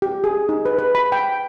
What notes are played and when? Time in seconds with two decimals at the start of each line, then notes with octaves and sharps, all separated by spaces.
0.02 G4
0.24 G#4
0.49 D#4
0.65 B4
0.79 B4
0.95 B5
1.12 G5